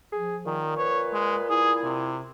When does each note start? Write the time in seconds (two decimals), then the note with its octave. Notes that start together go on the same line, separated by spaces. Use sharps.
0.13 F3 G#4
0.46 A#2 D#3
0.77 B4 C#5
1.13 G#3
1.50 E4 G#4
1.84 C3